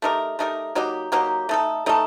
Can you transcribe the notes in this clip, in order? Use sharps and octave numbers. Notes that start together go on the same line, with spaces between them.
A3 D#4 G4 A#4
A3 D#4 G4 A#4
F#3 A#3 D#4 G4
F#3 A#3 D#4 G4
A3 D#4 A4
A3 D#4 A4